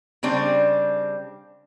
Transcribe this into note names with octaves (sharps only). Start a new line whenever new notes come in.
C#3 G3 C4 D4